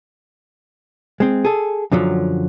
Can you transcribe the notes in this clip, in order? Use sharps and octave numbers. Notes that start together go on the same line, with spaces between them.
G#3 C4
G#4 A4
F#2 D3 F3 F#3